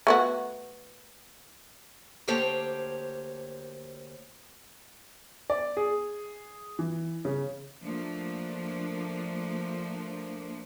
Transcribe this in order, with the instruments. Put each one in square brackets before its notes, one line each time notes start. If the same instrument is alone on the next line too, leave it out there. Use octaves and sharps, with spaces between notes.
[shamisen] A3 B3 F#4
[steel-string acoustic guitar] D2 A#3 G4 C5 C#5 A5
[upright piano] D5
G#4
E3
C#3
[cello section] F3 A3 A#3 D4